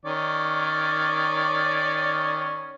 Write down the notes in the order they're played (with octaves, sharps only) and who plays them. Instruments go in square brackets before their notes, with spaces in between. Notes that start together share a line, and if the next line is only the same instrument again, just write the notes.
[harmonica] D#3 C#4 D5